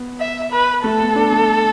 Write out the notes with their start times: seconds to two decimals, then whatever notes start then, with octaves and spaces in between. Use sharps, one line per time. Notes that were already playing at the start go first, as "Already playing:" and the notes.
Already playing: B3
0.20 E5
0.52 B4
0.84 A3 A4
1.00 B3
1.16 D4
1.32 A3